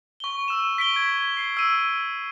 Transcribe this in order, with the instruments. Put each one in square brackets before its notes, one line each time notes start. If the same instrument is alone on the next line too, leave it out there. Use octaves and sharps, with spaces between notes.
[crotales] C#6 G7
E6 E7
B6 D7 G7
G#6
C7
E6 D#7